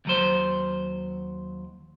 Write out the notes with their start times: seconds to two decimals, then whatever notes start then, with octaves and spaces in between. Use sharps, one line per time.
0.05 D#2 F#3 C5